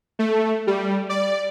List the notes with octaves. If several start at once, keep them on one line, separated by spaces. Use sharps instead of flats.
A3
G3
D5